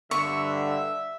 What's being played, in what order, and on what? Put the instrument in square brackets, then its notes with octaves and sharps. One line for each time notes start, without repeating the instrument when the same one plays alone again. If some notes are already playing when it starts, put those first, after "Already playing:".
[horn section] G2 D3 [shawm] E5 [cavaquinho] C#6